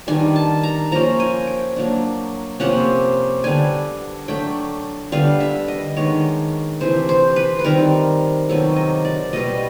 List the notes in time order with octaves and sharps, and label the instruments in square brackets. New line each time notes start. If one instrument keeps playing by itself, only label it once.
[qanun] D#3 G3 B3 D4 G#5
A5
A#5
F3 A#3 C#4 A#5
G#5
G5
F#3 A#3 D4
C3 F3 A#3 C#4 F#5
D3 G3 B3 D4 G#5
F#3 A3 D4 G5
D3 G3 B3 F5
E5
D#5
D#3 G#3 B3 D4 C#5
C3 E3 A3 C5
C5
B4
B4
D#3 G3 C4 A#4
C3 D#3 F#3 B3 A4
D#5
D5
B2 G3 B3 D#5